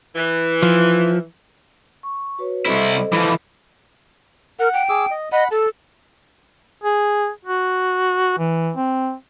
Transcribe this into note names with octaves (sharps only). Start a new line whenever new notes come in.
E3
F3
C#6
F#4 B4 C#5
C2 E4 A4 C5 D#5
E3 F3
A#4 F#5
G5
G#4 D6 E6
D#5
D#5 F#5 B5
A4 A5
G#4
F#4
E3
C4